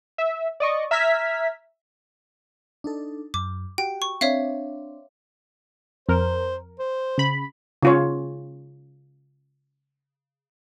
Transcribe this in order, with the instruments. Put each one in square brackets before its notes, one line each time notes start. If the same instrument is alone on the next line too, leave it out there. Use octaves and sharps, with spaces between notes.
[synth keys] E5
D5 D#5 C#6
E5 A#5 F6 G#6 B6
[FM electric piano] D4 D#4 A4
[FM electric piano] F#2 [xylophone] D6
[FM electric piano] F#4 G4 [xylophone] G5
[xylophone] C#6
[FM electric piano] C4 D4 [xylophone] C#5 E5 F5
[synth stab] F2 A#4 [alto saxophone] C5
[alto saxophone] C5
[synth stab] C#3 B5
[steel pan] C#3 F4 C#5